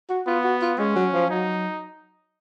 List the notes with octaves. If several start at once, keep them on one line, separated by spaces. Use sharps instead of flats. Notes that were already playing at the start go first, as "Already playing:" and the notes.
F#4
B3 F4
F#4
F4
G#3 C#4
F#3
F3
F#3 D#4